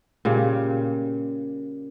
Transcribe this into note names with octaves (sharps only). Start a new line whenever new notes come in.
A#2 C#3 G3